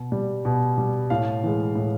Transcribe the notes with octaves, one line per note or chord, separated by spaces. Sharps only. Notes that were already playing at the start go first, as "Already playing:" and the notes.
Already playing: B2
G3
B2
G3
A2 F5
E3 G#3
A2